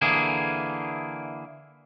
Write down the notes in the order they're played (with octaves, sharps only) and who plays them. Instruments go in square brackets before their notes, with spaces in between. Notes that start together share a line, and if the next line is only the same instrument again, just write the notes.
[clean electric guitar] D3 E3 A#3 G#4